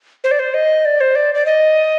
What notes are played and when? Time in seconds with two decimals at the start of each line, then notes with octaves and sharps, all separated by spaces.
0.24 C5
0.31 D5
0.39 C5
0.54 D#5
0.85 D5
1.01 C5
1.15 D5
1.34 D5
1.46 D#5